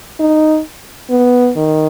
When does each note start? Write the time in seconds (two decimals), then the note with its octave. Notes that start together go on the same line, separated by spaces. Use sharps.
0.20 D#4
1.10 B3
1.56 D#3